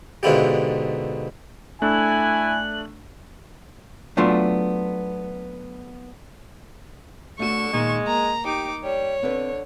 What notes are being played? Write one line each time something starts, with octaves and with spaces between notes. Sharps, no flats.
G#2 B2 D3 E4 F4 G4
A3 D4 E4 G#5 F#6
F#3 A3 B3 D4 F4
D3 A3 F#4 C#6 E7
A#2 D#3 G#3
A#3 A#5
D#4 G4 D6
G3 C#5
D3 C4 B4